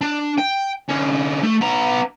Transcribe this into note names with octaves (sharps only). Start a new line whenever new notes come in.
D4
G5
D3 C#4
A3
B3 A#5